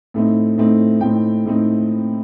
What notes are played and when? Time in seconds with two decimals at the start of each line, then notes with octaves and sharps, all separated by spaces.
0.14 A2 A3 C4 D#4
0.58 A2 A3 C4 D#4
1.01 A2 A3 C4 D#4 G5
1.46 A2 A3 C4 D#4